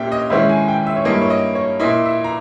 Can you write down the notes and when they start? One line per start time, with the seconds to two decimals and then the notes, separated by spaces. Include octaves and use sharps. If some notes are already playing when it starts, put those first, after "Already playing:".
Already playing: A#2 A#3 C#4 G4 E5 G5
0.12 D#5
0.30 G#2 D#3 G#3 C#4 E4 E5
0.49 G#5
0.68 G5
0.87 E5
0.96 C#5
1.05 G2 G3 A#3 E4 D#5
1.22 C#5
1.30 D#5
1.55 C#5
1.80 A#2 A#3 E4 D#5
2.05 E5
2.24 A#5